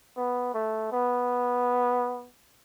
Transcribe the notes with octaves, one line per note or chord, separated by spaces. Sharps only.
B3
A3
B3